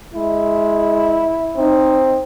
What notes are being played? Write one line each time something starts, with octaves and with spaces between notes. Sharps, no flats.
G#3 E4
C4 D#4